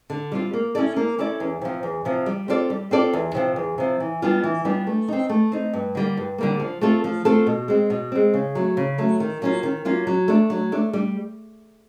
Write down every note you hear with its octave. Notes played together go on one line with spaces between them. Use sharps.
D3
G3 C4 F4
A#3
C#4 E4 A4 D5
A#3
C#4 E4 A4 D5
E2
C3 F3
E2
C3 F3
G3
C4 F4 A4 D5
G3
C4 F4 A4 D5
E2
C3 F3
E2
C3 F3
E3
G3 B3 D4 F4
E3
G3 B3 D4 F4
A3
C4 D#4
A3
C4 D#4
G2
D3 G3 A#3
G2
D3 G3 A#3
F3
A3 C4 F4 A4
F3
A3 C4 F4 A4
B2
G#3 C4
B2
G#3 C4
C#3
F#3 A3
C#3
F#3 A3
D#3
F#3 A#3 C#4 F4
D#3
F#3 A#3 C#4 F4
F#3
A3 D4
F#3
A3 D4
G3